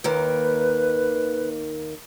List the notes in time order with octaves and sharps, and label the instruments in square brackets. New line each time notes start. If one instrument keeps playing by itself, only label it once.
[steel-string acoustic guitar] D#2 D#3 A#3 [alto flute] B4